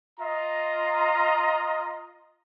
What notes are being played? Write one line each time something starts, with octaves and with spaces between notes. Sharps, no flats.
F4 D#5 A#5